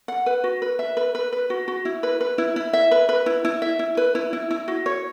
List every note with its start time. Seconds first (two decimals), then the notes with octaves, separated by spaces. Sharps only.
0.08 F#5
0.26 B4
0.44 F#4
0.62 B4
0.79 E5
0.97 B4
1.15 B4
1.33 B4
1.50 F#4
1.68 F#4
1.85 E4
2.03 B4
2.21 B4
2.38 E4
2.56 E4
2.73 E5
2.91 B4
3.09 B4
3.26 E4
3.45 E4
3.62 E5
3.79 E4
3.97 B4
4.15 E4
4.33 E4
4.51 E4
4.68 F#4
4.86 C#5